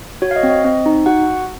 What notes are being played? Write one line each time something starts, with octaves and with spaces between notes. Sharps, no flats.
F#4 C#5
F5
D#5
C4
D#5
C4
D#4
F#4 F#5